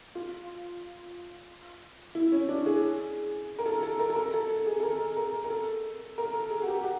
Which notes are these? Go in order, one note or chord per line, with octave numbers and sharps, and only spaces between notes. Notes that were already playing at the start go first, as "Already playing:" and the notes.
F4
E4
C#4
D4
G#4
A#4
A4
A4
A#4
A4
A#4
A4
A4
G#4
A4
A#4
A#4
A#4
A4
A#4
A4
G#4
F#4
G4
F#4